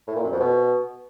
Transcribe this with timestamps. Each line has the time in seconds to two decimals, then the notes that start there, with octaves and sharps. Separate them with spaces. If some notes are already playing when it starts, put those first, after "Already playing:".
0.07 A2
0.16 A#2
0.24 F#2
0.32 F2
0.40 B2